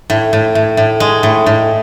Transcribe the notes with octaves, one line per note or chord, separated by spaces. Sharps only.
A2
A2
A2
A2
G#3
A2
A2